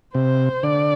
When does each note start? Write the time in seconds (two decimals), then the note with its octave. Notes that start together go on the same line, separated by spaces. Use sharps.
0.15 C3 C5
0.63 D3 D5